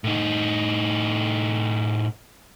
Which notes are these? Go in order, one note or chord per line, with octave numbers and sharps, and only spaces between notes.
A2 D#4